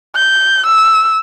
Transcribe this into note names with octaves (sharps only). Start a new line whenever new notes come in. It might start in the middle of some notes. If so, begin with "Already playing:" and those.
G6
E6